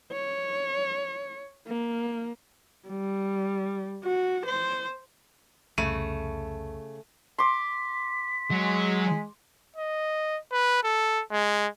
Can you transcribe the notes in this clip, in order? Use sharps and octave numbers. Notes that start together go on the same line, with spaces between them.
C#5
A#3
G3
F#4
C5
C2 F2 C#3 G3 A3 D#7
C6 D6 B6
F#3 G#3
D#5
B4
A4
G#3